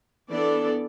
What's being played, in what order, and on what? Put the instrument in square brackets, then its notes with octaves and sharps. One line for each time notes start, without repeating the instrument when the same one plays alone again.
[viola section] E3 B3 D4 A4 D5